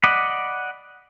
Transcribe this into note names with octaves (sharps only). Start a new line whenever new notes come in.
D5 D#5 F#5 B5